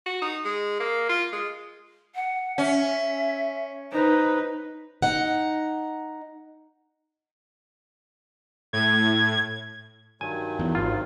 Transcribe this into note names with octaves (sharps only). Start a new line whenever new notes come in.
F#4
D#4
G#3
A#3
F4
G#3
F#5
C#4 E5
D#4 B4 C5
D#4 F#5
A2 G#6
G2 D#3 F#3 G#5
E2
G#1 F4